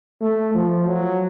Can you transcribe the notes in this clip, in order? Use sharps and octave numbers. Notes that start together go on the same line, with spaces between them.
A3
F3
F#3